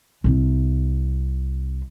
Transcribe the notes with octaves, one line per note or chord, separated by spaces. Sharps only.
C2 C3